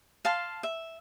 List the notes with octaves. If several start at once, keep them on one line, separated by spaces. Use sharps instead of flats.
F5 A5 C6
E5